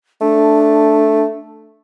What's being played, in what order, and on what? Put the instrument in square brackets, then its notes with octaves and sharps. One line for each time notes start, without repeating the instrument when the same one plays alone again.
[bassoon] A3 [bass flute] D4